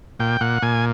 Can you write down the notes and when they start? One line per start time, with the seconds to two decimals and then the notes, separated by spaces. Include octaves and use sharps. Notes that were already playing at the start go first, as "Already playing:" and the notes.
0.20 A#2 G5
0.41 A#2 F#5
0.62 A#2 G#5